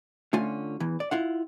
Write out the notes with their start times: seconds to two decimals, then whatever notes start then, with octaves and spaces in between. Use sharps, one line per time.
0.33 D3 A3 C#4 F4 G#5
0.80 E2 E3
1.00 D5
1.11 E4 F4 F#5